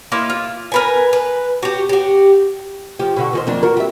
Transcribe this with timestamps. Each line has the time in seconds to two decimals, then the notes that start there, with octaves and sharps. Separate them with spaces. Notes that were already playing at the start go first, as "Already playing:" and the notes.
0.12 A#3 E4 F4 D#5
0.30 F4
0.72 A#4 B4 G#5
1.13 B4
1.62 F#4 G4
1.89 F#4 G4
2.99 F3 G4
3.16 B2 D3 F#4
3.33 D#3 G4 C5
3.47 F2 A#3 D4
3.63 F#4 A#4
3.77 G3 E5